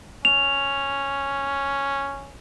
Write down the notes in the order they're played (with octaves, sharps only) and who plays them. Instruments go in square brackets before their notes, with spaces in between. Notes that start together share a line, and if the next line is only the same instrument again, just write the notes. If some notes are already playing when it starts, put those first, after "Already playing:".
[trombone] C#4 [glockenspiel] F7